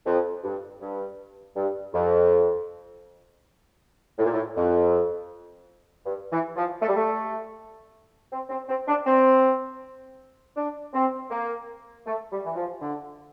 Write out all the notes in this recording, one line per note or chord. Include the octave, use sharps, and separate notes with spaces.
F2
G2
G2
G2
F2
A2
A#2
A2
F2
G2
E3
F3
A3
G3
A3
C4
C4
C4
D4
C4
D4
C4
A#3
A3
G3
E3
F3
D3